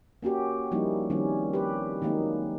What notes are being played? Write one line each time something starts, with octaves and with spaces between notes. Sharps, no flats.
A#3 C#4 F#4 G4
F3 G3 A#3 D#4 E4
D#3 G3 C4 C#4
G4 B4
D#3 F#3 G#3 A#3 D#4